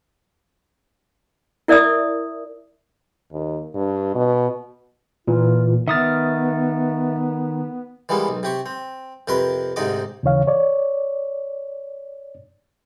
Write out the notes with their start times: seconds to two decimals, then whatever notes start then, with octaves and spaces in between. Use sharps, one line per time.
1.68 E4 A#4 D5 E5 D#6 E6
3.32 D#2
3.75 G2
4.15 B2
5.27 A#2 E3 F4
5.88 D#3 B3 E5 D#6 F6 A6
8.09 E3 G3 G#3 A#3 B3
8.28 B1
8.43 C3 G4 C#6
8.66 C4
9.28 F2 C3 A#4 B4 C6
9.76 D2 G#2 C3 D#4 D#5 D6
10.23 D#2 C#3 E3 C#5 F5
10.48 C#5 D5